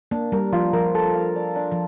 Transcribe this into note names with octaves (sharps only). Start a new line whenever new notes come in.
A#3 D4
G3 A#4
F3 F4
F3 A#4
A4
F5
D5
D4
F3